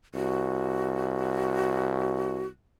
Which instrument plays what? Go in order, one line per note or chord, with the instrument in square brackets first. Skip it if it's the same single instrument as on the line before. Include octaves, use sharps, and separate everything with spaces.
[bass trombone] C2 [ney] F#4